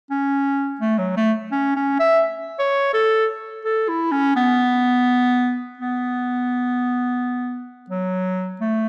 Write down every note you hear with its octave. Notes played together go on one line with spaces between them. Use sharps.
C#4
A3
F#3
A3
C#4
C#4
E5
C#5
A4
A4
E4
C#4
B3
B3
F#3
A3